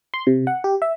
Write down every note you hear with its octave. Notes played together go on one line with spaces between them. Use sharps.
C6
C3
F#5
G4
E5